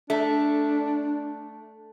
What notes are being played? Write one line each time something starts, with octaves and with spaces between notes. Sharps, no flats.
A3 D4